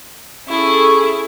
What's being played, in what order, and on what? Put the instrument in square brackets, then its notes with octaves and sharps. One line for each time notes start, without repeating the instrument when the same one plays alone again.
[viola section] C#4 G#4 A4 [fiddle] E4 [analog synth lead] C#6